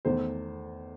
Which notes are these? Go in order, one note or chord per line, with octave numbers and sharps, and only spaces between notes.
E2 D#3 A3 C5